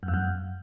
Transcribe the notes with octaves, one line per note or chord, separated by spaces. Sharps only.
F#2
F2
F#2